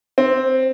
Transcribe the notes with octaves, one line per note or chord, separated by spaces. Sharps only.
C4